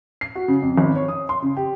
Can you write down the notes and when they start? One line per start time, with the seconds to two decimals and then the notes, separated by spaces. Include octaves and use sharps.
0.21 C7
0.35 F#4
0.48 C#3
0.62 F2
0.78 G#1
0.96 C#5
1.08 D#6
1.29 C6
1.42 C#3
1.57 G4